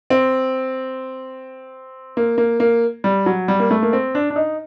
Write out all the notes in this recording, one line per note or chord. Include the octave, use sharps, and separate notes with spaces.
C4
A#3
A#3
A#3
G3
F#3
G3
A#3
A3
A#3
C4
D4
D4
D#4